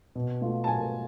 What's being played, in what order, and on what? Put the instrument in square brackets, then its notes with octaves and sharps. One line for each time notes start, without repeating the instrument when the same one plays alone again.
[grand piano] B2
A3 F4
[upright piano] A5
[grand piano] B2 [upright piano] G#5